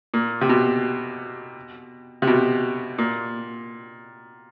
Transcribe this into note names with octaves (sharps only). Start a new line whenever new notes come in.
A#2
C3
B2
C3
B2
A#2